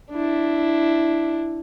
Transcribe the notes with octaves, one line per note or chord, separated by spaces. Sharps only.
D4 E4